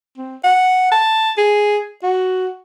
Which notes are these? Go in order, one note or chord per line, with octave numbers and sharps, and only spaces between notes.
C4
F#5
A5
G#4
F#4